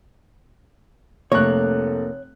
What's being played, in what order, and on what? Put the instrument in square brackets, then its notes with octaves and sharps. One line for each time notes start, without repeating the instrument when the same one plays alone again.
[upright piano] F1 A3 F#6 [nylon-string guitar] A#3 [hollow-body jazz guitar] C#5